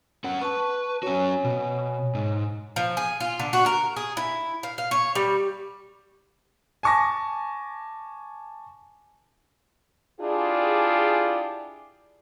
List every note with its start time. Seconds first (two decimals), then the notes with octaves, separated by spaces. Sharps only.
0.24 C#4 C#5 F#5
0.41 B4 A5 C#6
1.03 C#4 F#4 C#5 G#5
1.44 B2
2.15 G#2
2.76 F3
2.97 G#4
3.20 F4
3.40 D3
3.53 F#4
3.66 A#4
3.96 G#4
4.17 E4
4.63 F5
4.78 F5
4.91 C#5
5.15 G3
6.83 G#5 A5 C#6 D6 A#6
10.21 D4 E4 F4 G4 G#4